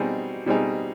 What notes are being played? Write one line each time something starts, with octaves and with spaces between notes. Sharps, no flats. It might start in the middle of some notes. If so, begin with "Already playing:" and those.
Already playing: B2 G3 C4 D#4 G#4
B2 G3 C4 D#4 G#4